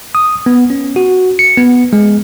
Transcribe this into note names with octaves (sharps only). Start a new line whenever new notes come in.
D#6
B3
C#4
F#4
C#7
B3
G#3